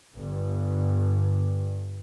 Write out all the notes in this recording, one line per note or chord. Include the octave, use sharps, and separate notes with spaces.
G1 G2